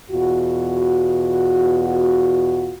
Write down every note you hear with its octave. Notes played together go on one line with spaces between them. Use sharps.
E2 B2 F4 F#4